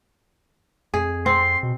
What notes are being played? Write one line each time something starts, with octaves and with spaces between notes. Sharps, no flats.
F2 G#4
C4 C6
B2